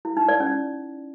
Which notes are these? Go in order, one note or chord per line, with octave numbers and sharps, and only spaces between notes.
E4
D#4
D5
C#4